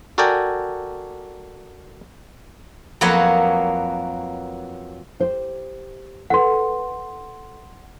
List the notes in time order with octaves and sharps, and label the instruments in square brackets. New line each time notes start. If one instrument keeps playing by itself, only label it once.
[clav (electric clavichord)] F#4 A4 A#4 D5 G5 G#5
[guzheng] F2 F#3 A#3 B3 B4 C#5
[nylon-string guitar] G4 C5
[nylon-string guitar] A4 B4 [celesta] F#5 C6